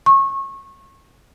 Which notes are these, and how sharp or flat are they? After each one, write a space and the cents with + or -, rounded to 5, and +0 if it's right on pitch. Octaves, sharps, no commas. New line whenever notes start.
C#6 -25